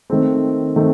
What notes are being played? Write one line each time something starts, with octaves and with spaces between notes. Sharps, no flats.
D#3 A3 C4
D#3 A3 C4